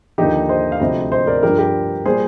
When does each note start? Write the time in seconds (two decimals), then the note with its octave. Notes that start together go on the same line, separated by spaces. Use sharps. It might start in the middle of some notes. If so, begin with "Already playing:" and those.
0.18 D#2 D3 F3 D#4 G4
0.49 C5 D#5
0.72 F5
0.80 D2 C3 F3 C5 D#5
1.12 C5 D#5
1.27 A#4 D5
1.43 G2 F3 G4 A#4
1.58 G4 A#4
2.05 A#2 G3 G#4 C5